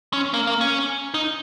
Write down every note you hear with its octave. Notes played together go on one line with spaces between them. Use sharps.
C#4
A#3
A#3
C#4
D#4